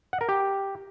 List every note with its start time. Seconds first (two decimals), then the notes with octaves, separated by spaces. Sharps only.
0.13 F#5
0.21 A#4
0.29 G4